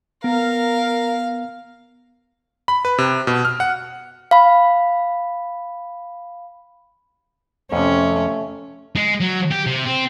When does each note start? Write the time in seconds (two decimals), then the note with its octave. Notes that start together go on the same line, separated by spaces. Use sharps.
0.24 B3 A#4 F5
2.68 B5
2.85 B4
2.98 C3
3.27 B2
3.45 F6
3.60 F#5
4.31 F5 B5
7.73 F2 C3 A3 C#4
8.96 G#3
9.21 F#3
9.51 G4
9.66 C3
9.86 C4